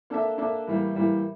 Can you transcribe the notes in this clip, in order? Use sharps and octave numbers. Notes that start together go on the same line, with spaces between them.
A#3 D4 A4 E5
A#3 D4 A4 E5
A2 E3 G3 A#3
A2 E3 G3 A#3